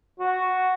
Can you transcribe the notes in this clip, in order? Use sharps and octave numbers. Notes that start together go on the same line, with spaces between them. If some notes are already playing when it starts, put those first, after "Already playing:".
F#4